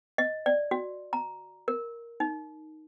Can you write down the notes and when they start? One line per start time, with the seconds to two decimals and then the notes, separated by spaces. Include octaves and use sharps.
0.18 D#5
0.46 D5
0.71 F#4
1.13 A#5
1.68 A#4
2.20 D#4